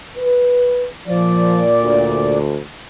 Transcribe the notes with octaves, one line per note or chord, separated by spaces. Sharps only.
B4
A#2 F3 D5
D2